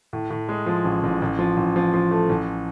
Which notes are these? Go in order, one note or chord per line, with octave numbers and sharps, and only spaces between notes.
A2
A2
G#3
F3
A1
A1
A1
F3
A1
F3
F3
A3
A1